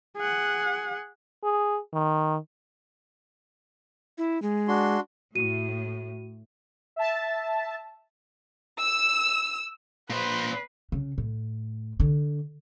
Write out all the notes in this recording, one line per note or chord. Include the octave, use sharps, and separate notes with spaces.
G#4 F#5
G#4
D#3
E4
G#3
D4 F#4 C6
A2 F#4 D#7
E5 A5
E6
A#2 B4 C5
C#3
A2
D3